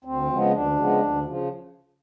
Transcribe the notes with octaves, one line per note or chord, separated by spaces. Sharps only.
D2 C4
C#3 F3 G#3 B3
D2 D4
C#3 F3 G#3 B3
D2
C#3 F3